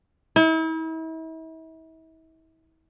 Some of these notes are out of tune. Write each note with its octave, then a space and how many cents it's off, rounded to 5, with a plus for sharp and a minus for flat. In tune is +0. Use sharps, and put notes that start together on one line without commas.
E4 -40